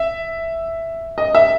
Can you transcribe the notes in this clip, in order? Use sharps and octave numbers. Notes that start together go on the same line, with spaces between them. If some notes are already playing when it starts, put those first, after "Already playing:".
Already playing: E5
D#5
E5